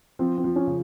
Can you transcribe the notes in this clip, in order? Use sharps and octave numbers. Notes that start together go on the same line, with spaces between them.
F3 C4
C4
F3
C#4
C#3